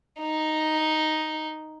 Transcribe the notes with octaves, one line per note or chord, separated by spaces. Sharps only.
D#4